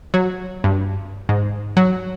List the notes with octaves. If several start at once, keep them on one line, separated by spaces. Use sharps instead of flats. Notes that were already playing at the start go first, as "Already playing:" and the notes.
F#3
G2
G#2
F#3